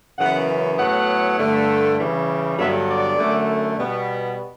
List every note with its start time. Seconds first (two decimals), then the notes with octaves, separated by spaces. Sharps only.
0.19 F#2 C#3 E3 B3 F#5
0.78 A2 F#3 B3 F#5
1.38 G2 D3 A3
1.98 C#3 E3 G3
2.58 G2 D3 F#3 B3 E5
2.88 D5
3.18 F#2 D3 A3
3.77 B2 G3 B3